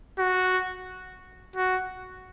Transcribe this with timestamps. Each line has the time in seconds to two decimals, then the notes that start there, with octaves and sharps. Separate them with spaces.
0.19 F#4
1.56 F#4